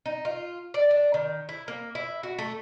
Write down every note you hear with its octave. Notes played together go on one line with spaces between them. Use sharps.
D#4
F4
D5
D4
D#3
E4
A#3
E4
F#4
A3